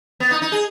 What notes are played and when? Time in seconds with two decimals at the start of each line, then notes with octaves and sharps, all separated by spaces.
0.20 B3
0.31 D#4
0.42 D#4
0.52 G#4